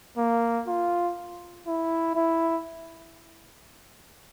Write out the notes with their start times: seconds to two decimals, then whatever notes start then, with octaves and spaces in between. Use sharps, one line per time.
0.17 A#3
0.67 F4
1.67 E4
2.15 E4